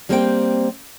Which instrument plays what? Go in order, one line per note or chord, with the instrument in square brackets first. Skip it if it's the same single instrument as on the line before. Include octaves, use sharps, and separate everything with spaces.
[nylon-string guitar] G3 A#3 C4 C5 C#5 G5